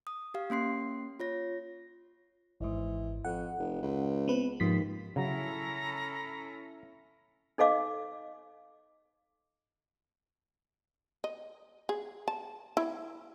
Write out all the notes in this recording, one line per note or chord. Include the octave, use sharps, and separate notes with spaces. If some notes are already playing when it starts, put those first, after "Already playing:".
D#6
G4 F5
A#3 C#4 C6 C7
F4 C#5 A#6
G#1 G#2 E3
F2 F#5
F1
C#2
B3 C4 B4
D#2 G#2 F3 B6
C#3 F#3 C#4 E4 A4 A#5
D#4 A4 D#5 F5 D6
D#5
G#4
A5
E4